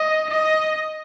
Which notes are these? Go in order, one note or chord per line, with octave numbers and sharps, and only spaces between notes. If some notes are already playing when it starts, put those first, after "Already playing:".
Already playing: D#5
D#5